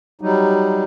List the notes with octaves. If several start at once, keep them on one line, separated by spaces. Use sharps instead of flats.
F#3 G3 D#4